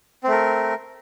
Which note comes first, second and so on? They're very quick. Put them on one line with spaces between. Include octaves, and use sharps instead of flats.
C4 A3 A#4